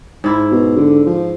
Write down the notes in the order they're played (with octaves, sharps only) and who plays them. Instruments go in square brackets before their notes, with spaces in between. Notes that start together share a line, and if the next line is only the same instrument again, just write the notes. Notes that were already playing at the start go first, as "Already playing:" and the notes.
[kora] G#2 E4
[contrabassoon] B2
D3
F3